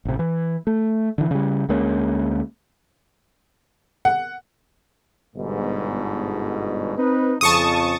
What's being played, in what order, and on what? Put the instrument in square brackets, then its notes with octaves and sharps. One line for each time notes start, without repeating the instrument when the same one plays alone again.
[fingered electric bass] A1 C3
E3
A3
D3 E3
C#3 G3
D2 G#3 A#3 C#4
[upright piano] F#5
[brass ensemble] G1 G#2 B2
C4 D#4 B4
[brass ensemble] F2 C#3 [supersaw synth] A5 C#6 D#6